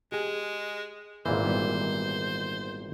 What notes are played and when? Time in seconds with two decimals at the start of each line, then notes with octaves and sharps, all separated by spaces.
0.12 G#3 G4 G#4
1.26 G#1 A#2 E3 A#3 C5
1.45 D#3 G3 B3